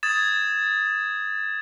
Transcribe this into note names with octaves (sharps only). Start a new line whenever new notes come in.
D#6 G#6 A6 E7